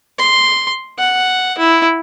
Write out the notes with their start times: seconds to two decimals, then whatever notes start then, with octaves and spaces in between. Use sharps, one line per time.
0.19 C6
0.98 F#5
1.58 E4